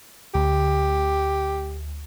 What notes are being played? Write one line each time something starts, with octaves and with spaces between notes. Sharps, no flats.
D2 G4